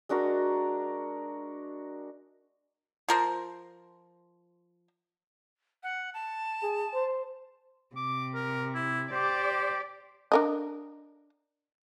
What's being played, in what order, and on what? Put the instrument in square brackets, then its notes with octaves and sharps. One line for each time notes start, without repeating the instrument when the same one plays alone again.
[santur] G#3 D4 F#4 A#4
[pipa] F3 A#4 C5
[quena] F#5
A5
[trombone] G#4
C5
[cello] C3 [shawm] D6
[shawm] A#4
E4
[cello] G4 D5 [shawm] C5
[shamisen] D4 A#4 D#5